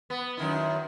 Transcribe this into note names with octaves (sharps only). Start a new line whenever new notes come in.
B3
F#2 D#3 E4